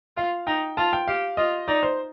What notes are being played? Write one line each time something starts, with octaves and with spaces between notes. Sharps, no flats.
F4 F5
D#4 G5
F4 A5
G5
G4 F5
F4 D#5
D#4 D5
C5